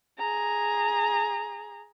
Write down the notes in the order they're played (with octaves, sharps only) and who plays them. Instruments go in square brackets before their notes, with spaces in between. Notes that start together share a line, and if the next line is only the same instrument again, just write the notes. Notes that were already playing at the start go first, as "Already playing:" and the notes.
[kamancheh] G#4 A#5